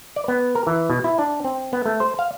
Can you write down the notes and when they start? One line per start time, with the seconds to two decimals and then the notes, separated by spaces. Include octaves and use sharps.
0.16 D5
0.28 B3
0.55 A#4
0.67 E3
0.90 B2
1.04 E4
1.19 D4
1.44 C4
1.73 B3
1.86 A3
2.00 C5
2.19 F5